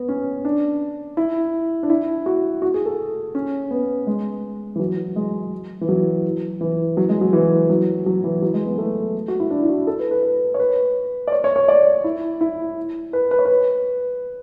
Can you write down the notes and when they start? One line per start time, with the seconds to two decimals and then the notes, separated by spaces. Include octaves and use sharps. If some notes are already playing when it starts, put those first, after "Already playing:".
Already playing: B3
0.09 C#4
0.45 D4
1.17 E4
1.83 D4
1.90 E4
2.26 F#4
2.62 F#4
2.74 G#4
2.86 A4
3.35 C#4
3.71 B3
4.07 G#3
4.76 E3
4.79 F#3
5.16 G#3
5.81 E3
5.89 F#3
6.61 E3
6.97 F#3
7.09 G#3
7.21 F#3
7.33 E3
7.70 F#3
8.06 F#3
8.24 E3
8.42 F#3
8.54 G#3
8.66 B3
8.78 A3
9.28 F#4
9.40 E4
9.50 D4
9.64 E4
9.69 F#4
9.87 A4
9.99 B4
10.11 B4
10.23 B4
10.54 C#5
10.60 B4
11.27 D5
11.32 C#5
11.44 C#5
11.56 C#5
11.68 D5
12.04 E4
12.41 E4
13.13 B4
13.31 B4
13.39 C#5
13.45 B4